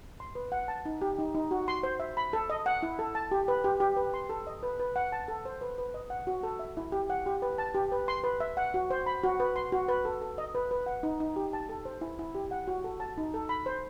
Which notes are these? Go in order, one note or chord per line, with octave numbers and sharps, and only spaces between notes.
C6
B4
F#5
A5
D#4
G4
D#4
D#4
F#4
C6
C5
E5
B5
A4
D#5
F#5
E4
A4
A5
G4
B4
G4
G4
B4
C6
A4
D#5
B4
B4
F#5
A5
A4
C5
B4
B4
D#5
F#5
F#4
A4
E5
E4
G4
F#5
G4
B4
A5
G4
B4
C6
B4
E5
F#5
F#4
C5
B5
F#4
B4
C6
F#4
B4
A4
A4
D#5
B4
B4
F#5
D#4
D#4
G4
A5
A4
C5
E4
E4
G4
F#5
F#4
A4
A5
D#4
A4
B5
C5